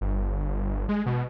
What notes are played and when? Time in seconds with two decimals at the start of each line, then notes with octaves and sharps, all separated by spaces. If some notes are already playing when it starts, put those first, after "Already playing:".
0.01 G1
0.89 G#3
1.06 B2